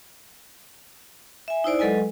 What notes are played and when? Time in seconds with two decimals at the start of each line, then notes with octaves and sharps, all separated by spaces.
1.48 E5 G#5
1.64 D#4 E4 C5 D5
1.79 F#3 G#3 A4 B4 D#5 G#5